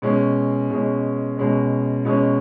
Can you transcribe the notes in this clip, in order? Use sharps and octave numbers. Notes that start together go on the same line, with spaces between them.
B2 G#3 C#4
B2 G#3 C#4
B2 G#3 C#4
B2 G#3 C#4